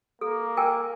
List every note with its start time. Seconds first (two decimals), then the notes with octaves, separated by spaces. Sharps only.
0.21 A#3 A4
0.57 A#4 G5 G#5